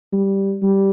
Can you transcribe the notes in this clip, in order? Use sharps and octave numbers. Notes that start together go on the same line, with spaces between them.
G3
G3